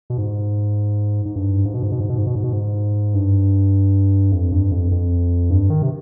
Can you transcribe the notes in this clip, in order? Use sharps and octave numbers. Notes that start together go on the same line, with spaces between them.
B2
G#2
G#2
G2
G#2
B2
G#2
B2
G#2
B2
G#2
B2
G#2
B2
G#2
G2
F2
G2
F2
F2
G2
D#3
C3